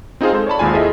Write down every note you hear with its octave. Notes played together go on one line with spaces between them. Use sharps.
C4 D#4 F4 G#4 C5 F5
G#3 A4 C5
C#5 D5 A5 B5
G#1 D#2 G#2 F4 G#5
E4 F4 G#4 A4 D#5 E5